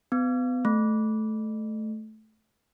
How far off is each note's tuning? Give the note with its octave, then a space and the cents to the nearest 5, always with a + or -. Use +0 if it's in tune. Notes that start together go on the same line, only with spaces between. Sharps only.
B3 +30
A3 -15